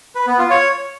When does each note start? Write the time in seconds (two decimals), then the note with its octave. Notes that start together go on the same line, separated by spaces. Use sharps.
0.15 B4
0.27 B3
0.39 F4
0.50 C#5